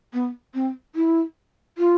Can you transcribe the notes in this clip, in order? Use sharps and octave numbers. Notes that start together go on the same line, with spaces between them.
B3
C4
E4
F4